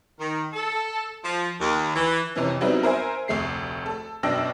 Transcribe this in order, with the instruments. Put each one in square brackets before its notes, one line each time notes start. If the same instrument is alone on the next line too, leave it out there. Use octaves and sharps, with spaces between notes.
[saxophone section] D#3
A4
F3
D#2
E3
[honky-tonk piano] F2 C3 E3 C#4
F#3 G3 B3 C4 D#4 E4
A#4 C5 E5 G#5
F1 D2 A3 C7
A4
F#2 B2 D4 G5 E6 A#6